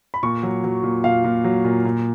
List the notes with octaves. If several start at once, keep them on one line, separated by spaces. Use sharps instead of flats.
B5
A#2 C#6
F#3
F#3
A#2
A#2 F5
A#2
F#3
A#2
A#2